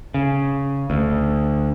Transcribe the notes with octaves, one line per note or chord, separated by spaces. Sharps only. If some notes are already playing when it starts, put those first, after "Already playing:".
C#3
D2